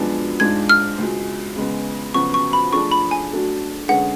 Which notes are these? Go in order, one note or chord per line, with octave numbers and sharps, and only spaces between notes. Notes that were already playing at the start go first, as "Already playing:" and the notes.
Already playing: F#2 F3 G#3 B3 D4
G#2 G#3 D4 F4 G#6
F6
C#2 B2 G#3
C#3 G#3 B3
F2 C#3 F#3 B3 F#4 C#6
C#6
B5
F3 A3 D4 G#4 C#6
B5
G#5
B2 F#3 A3 D4 F#4
D3 G#3 C#4 G#4 B4 F#5